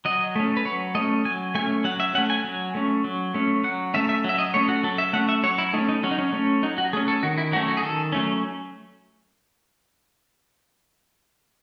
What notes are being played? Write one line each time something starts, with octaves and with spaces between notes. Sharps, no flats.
F#3 D#5
A3 C#4
B4
F#3 C#5
A3 C#4 D#5
F#3 G#5
A3 C#4 G#5
F#3 F#5
E5
A3 C#4 F#5
G#5
F#3
A3 C#4
F#3
A3 C#4
F#3 F#5
A3 C#4 E5
E5
F#3 E5
D#5
A3 C#4 C#5
F#4
F#3 A4
E5
A3 C#4 F#5
E5
F#3 C#5
E4
A3 C#4 D#4
D#4
F#3 C#4
D#4
C#4
A3 C#4
F#3 D#4
F#4
A3 C#4 G#4
A4
D#3 F#4
E4
F#3 A3 C#4 F#4
F#4
G#4
D#3 A4
F#3 A3 C#4